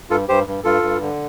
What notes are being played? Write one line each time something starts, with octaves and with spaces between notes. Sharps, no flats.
G2 F4 A4
G2 G4 C5
G2
G2 F4 A4
G2
D3